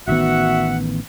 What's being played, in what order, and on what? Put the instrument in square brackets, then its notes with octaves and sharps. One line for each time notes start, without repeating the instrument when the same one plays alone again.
[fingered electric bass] A1 D#3 B3 [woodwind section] F#4 E5 F#5